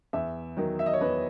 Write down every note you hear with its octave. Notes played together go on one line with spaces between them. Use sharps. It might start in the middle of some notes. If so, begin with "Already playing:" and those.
E2 E5
D#3 F#3
E5
D#5
C#5
E2 B4